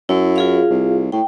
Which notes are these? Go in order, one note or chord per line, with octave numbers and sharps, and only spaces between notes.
F#2 E4
F4 G#4 F5
C2
A2 G5